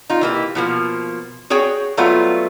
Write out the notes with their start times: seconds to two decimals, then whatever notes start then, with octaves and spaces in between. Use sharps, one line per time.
0.10 D#4 F4
0.21 E3 A#3 G4
0.55 B2 F3 A#3
1.50 F#4 G#4 C#5 G5
1.97 F#3 G3 A3 B3 F4